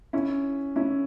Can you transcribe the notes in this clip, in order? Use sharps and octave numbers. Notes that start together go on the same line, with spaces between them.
C#4 E4
C#4 E4